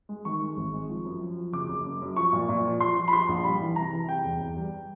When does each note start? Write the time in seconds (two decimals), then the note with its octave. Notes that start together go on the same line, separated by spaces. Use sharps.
0.09 G#3
0.25 D#3 C#6
0.41 G#3
0.57 G#1
0.73 G#3
0.89 F3
1.05 F#2
1.21 F3
1.37 F3
1.53 F#1 D6
1.69 F#1
1.85 F#2
2.01 F#2
2.16 F3 C#6
2.33 A#2
2.49 A#2
2.65 F3
2.80 F3 C6
2.97 F3
3.08 B5
3.13 F3 C6
3.28 A#1
3.44 G3 B5
3.61 E3
3.76 C3 A#5
3.92 E3
4.08 C3 G5
4.24 E2
4.41 E2
4.56 G3